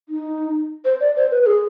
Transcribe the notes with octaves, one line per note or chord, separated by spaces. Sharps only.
D#4
C5
D5
C5
B4
B4
G#4